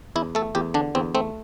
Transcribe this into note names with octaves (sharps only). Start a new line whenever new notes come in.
E2 E4
A3 A4
E2 G4
D3 D4
E2 C4
A3 C4